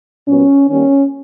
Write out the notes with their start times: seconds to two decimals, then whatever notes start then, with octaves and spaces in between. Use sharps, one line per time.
0.27 A#2 F#3 B3 C#4
0.69 D#3 G3 A#3 C#4